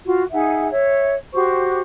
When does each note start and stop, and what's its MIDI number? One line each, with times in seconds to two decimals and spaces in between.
0.04 0.24 65
0.04 0.24 66
0.32 0.68 63
0.32 0.68 68
0.32 0.68 76
0.32 0.68 78
0.71 1.14 73
0.71 1.14 76
1.33 1.80 66
1.33 1.80 67
1.33 1.80 72
1.33 1.80 85